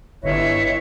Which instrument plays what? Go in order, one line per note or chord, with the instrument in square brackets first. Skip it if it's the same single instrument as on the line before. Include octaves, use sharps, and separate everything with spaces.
[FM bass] G1 [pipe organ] E4 B4 D#5 [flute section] C#5 E5